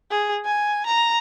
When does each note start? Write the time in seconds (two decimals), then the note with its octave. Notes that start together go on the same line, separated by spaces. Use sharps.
0.11 G#4
0.45 G#5
0.86 A#5